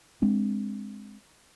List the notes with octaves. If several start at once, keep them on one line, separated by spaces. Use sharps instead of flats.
G#3 C4 D4